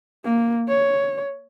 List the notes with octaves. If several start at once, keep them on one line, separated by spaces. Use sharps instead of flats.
A#3
C#5